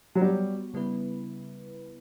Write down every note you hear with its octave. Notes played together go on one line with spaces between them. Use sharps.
F#3
G3 B3 F#4 C#5
C#3 G3 B3 E4 B4